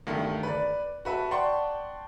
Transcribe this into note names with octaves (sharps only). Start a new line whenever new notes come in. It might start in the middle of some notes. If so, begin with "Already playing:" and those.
D2 G2 D#3 A3
B4 D5
F#4 B4 E5 A5
D5 F#5 G5 A5 C6 C#6